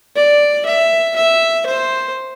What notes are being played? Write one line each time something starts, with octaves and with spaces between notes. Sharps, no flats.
D5
E5
E5
C5